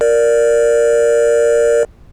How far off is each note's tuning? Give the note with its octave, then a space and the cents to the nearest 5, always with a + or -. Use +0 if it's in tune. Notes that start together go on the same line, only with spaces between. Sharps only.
A#4 +0 D5 +0